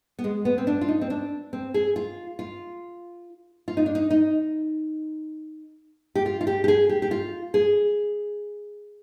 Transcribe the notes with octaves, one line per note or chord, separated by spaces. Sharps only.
B3
G#3
B3
C4
D4
F4
D#4
C4
D4
C4
G#4
F4
F4
F4
D#4
D4
D#4
D#4
G4
F4
F4
G4
G4
G#4
G4
G4
F4
G#4